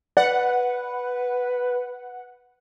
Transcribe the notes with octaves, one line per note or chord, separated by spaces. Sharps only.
B4 D5 F#5